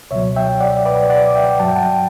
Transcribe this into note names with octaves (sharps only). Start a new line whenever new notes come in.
C#2 B2 F#3 C#5 E5
E5 G5
D5 F#5
B4 D5
D5 F#5
E5 G5
G2 F#3 A5
G5
F#5 A5